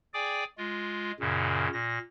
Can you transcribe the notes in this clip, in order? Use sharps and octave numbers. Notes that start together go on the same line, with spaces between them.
G#4 D5 G5 G#5 D6
G#3 F4
F#2 A#2 C#3
A#2 A#6